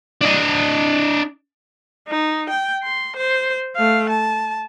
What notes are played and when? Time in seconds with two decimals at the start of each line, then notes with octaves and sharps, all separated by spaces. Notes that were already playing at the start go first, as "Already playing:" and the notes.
0.21 D4 D#5
2.08 D#4
2.49 G5
2.83 C6
3.16 C5
3.76 A3 F5
4.09 A5